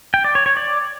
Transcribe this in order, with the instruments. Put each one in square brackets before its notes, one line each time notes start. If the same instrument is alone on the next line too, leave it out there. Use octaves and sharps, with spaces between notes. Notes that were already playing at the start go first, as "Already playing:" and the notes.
[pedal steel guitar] G5
D5
C#5
C#5
D5